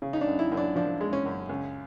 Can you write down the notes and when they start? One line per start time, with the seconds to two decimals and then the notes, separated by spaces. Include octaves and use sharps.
0.02 C#3
0.13 D#4
0.21 D4
0.27 F#2
0.39 E4
0.52 F#2
0.57 D4
0.76 F3 D4
1.01 G#3
1.13 C#4
1.25 F#2
1.49 C#2